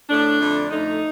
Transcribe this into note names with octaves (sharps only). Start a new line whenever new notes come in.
A2 A3 D4
F2 D3 A3
F2 D3 A3 D#4